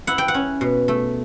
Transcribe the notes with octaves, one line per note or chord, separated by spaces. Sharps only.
E4 F#5
G5
F#5
C#4
B2
A3